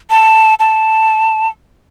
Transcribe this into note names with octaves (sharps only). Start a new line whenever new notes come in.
A5
A5